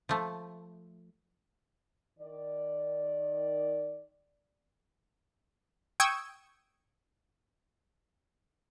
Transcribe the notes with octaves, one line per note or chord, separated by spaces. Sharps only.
F3 A3
D#3 D5
G5 C#6 D#6 E6 G#6